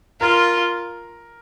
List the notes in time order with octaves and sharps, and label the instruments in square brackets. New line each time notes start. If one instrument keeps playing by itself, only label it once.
[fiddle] F4 [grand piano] A#4